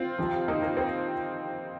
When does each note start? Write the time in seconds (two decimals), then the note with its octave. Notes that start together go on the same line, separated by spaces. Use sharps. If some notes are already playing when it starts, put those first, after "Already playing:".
Already playing: C4 F4
0.18 F2 C3 F3
0.48 A#3 D#4
0.62 A#3
0.77 C4